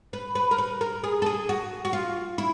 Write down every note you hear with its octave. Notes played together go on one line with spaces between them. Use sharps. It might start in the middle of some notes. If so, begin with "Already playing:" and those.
B4
B4
A#4
B4
A#4
G#4
A4
G#4
F#4
F#4
F4
E4